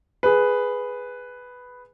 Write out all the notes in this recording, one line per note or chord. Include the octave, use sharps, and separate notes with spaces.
G#4 B4